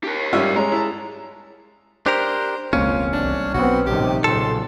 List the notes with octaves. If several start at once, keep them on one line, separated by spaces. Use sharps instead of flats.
G4 A#4
G#2 G3 C#4 F4 E5
G#3 C#5 A#5
E4 A5
D4 G4 A#4 C5
E1 C#2 A#3 C4 C#4 F4
C2 D4
B1 F#3 B3 C4 F#4
A#1 C3 D#3 G3 G4
B1 A#2 C#3 A4 C6